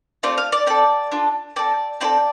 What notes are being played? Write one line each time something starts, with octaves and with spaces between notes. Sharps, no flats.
A3 C4 F4 D5
F5
D5
C4 A4 D5
D4 F4 A4
C4 A4 D5
C4 F4 A4 D5